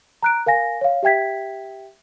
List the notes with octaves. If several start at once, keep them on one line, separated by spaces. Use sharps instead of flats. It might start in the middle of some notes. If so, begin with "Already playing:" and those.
A#5 F#6 D7
A#4 F5 G#5 A#6
C#5 F5
G4 E5 G5 G#6 B6